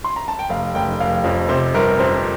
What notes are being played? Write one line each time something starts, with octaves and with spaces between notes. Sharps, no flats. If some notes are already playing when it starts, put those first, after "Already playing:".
C6
A#5
A5
G5
F1 F5
F1 G5
F1 F5
F2
C3 C5
G1 A#4
F2 C5